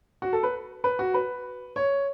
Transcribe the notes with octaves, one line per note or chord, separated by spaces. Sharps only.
F#4
A4
B4
B4
F#4
B4
C#5